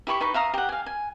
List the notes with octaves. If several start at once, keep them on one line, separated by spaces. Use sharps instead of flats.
E4 G4 B5 C#6
D#4 B4 B5 C#6
E5 F5 A#5 D#6
G4 F#5
F5 G#5
G#5